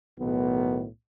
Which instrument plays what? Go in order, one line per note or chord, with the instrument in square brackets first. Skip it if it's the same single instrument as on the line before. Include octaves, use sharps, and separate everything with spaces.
[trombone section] B1 A2 D#3 B3